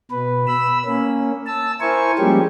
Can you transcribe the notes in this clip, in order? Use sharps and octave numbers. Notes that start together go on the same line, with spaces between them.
B2 B4
B5 E6
A#3 C#4
A5 E6
E4 A#4 C5 G#5 C#6
F3 G3 G#3 A#3 C#4 G4